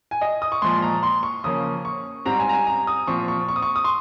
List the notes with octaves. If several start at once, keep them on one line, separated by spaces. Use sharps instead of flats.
G#5
D#5
D#6
C#6
A#2 F3 G#3 C6
A#5
C6
C#6
C#3 F3 A#3 C#4 D#6
C#6
G#2 G3 C4 A#5
G#5
A#5
G#5
A#5
D#6
A#2 F3 C4 C#6
C#6
C#6
D#6
C#6
D#6
C6